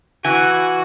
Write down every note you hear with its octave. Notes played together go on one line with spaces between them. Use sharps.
E3 F#4 G#5